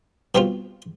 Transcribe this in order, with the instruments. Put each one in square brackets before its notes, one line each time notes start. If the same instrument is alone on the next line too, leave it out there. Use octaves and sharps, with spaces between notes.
[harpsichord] B2 G3 C4 F4